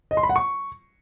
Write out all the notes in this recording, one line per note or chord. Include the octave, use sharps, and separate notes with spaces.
D#5
C6
B5
F#5
C#6